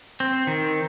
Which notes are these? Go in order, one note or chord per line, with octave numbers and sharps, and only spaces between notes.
C4
D#3